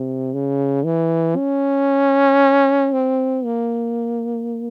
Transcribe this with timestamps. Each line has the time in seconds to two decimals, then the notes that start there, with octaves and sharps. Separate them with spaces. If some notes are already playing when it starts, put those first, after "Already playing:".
Already playing: C3
0.33 C#3
0.84 E3
1.36 C#4
2.93 C4
3.45 A#3